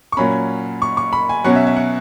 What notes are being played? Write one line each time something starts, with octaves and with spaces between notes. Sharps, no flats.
C#6
A#2 F#3 C#4 B5
C#6
C#6
B5
G#5
B2 F#3 C#4 F#5
E5
E5
F#5